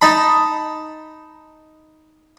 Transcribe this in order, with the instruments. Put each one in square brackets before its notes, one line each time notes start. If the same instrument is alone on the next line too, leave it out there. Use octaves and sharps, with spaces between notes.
[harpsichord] D#4 A5 B5